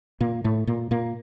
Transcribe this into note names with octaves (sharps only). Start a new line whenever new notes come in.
A#2 A#3
A2 A3
A#2 A#3
A#2 A#3